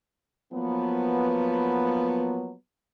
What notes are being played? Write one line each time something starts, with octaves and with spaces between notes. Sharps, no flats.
F3 F#3 A#3 B3